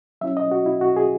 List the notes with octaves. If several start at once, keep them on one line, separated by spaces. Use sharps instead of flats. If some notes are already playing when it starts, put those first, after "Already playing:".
F#3 C#4 E4 E5
D#5
F#4
E4
F#4
G#4